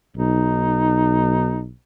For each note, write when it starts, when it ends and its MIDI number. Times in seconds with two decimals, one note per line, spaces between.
0.16 1.72 35
0.16 1.65 63